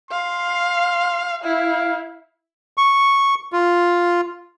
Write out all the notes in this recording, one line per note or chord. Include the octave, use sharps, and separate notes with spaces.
F5 C6
E4 F5
C#6
F4